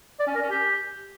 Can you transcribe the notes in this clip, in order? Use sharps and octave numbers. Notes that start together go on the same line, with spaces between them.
D5
C#4
A#4
C#4
G4